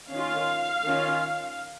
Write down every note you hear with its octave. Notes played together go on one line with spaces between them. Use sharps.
D#3 C#4 F4 F5
D#3 C#4 F4